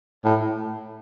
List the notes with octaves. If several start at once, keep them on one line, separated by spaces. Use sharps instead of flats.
A2